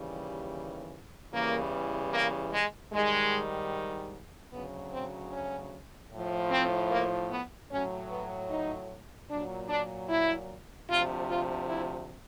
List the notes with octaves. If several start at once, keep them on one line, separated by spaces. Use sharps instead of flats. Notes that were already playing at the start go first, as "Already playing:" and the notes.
Already playing: D#2 C#3 E3 G3
E2 C#3 E3 G3 A#3
A#3
G#3
G#2 D#3 G3 G#3
D2 C#3 F#3 B3
C4
C#4
A2 F3
C4
A#3
B3
A2 F#3 C#4
B3
D#4
A#2 F#3 D4
D4
E4
D2 C3 F3 F4
F4
E4